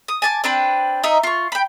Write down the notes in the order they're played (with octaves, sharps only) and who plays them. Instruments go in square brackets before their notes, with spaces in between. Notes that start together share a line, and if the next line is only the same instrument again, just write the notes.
[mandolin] D#6
G#5 A5 D6
C4 D4 B4 G5
D#4 D#5 E5
F4 C#6
G5 B5